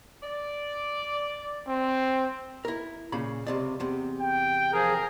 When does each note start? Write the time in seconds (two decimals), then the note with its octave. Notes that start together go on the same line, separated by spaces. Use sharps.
0.23 D5
1.68 C4
2.65 E4 A#4
3.12 A#2 C#3 B5
3.47 C#2 C3 D5
3.80 E2 C3
4.21 G5
4.73 F3 G#4 A#4